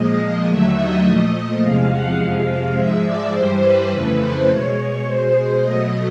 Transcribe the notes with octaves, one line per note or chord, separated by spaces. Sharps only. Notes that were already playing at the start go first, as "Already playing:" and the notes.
Already playing: A#2 F3 G#3 D#5
D#2 D3 F#3 A3 E5
D#5
A#2 F3 A3 D#5
E2 C3 F3 G#3 F5
F#5
F2 C3 F3 G#3 F5
G#2 F3 G#3 E5
D5
G2 E3 G3 C5
B4
F2 C#3 E3 A3
C5
B2 G#3 C#5
B2 G#3 C5
B2 F#3 A3 D#5